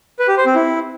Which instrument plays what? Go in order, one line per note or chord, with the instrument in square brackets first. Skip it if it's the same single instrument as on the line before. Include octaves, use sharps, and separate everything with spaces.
[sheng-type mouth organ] B4
G4
C5
C4
E4